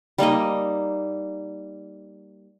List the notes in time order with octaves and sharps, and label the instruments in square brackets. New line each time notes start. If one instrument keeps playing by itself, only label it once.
[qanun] G3 A#3 D#4 D#5